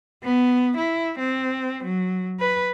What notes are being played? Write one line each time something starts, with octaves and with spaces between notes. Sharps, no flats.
B3
E4
C4
F#3
B4